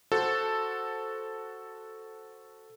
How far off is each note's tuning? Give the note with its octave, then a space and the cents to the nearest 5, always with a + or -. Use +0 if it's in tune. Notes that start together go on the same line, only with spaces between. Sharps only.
F#4 +0 A4 +0 C5 +0